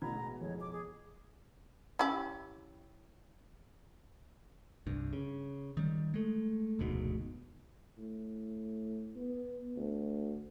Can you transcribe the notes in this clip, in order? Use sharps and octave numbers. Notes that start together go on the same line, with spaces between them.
A1 B2 E3 A#5 B5 G#6
G#3
F2 G#3 C#5
D6
G#4
C#4 E4 G4
C2 G2
C#3
D#3 G3
G#3 A3
F1 D2 G#2 B2
A2
B3
D2